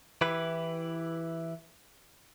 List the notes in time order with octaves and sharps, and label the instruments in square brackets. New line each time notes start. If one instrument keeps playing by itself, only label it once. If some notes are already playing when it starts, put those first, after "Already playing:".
[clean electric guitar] E3 E4 G4 B4